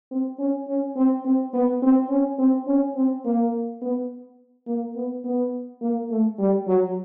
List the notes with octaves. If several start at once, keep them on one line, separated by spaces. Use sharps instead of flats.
C4
C#4
C#4
C4
C4
B3
C4
C#4
C4
C#4
C4
A#3
B3
A#3
B3
B3
A#3
A3
G3
F#3